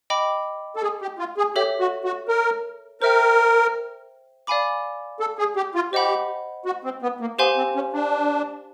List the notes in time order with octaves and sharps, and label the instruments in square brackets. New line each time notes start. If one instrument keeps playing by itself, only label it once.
[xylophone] D#5 G5 B5 D6
[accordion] A4
G#4
G4
F4
G#4
[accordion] G4 [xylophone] A4 C#5 E5
[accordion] F#4
F#4
A#4
[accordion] A#4 [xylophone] C5 E5 G5
[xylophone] D5 F5 G#5 B5 D6
[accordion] A4
G#4
G4
F4
[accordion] G4 [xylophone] C5 D#5 F#5 B5
[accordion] F#4
C4
B3
A#3
[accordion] B3 [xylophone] G4 C5 F5 G#5 C6
[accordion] C4
C#4
D4